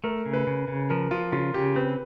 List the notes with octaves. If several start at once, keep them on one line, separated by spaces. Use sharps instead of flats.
A3 A#4
C#3
B4
C#3
C#3
F3 A#4
F3 F4
C#3 F4
C#3 G4
C4 B4